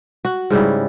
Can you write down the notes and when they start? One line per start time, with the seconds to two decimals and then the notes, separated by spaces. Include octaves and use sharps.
0.25 F#4
0.50 G#2 C#3 G3 E4